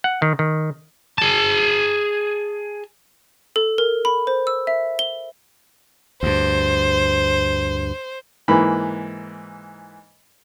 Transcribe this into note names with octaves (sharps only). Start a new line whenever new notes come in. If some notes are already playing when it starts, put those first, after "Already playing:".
F#5
D#3
D#3
G#4 A5
A4
A#4
B5
C5
E6
E5
G7
D2 G2 C5
G#2 E3 A#3 B5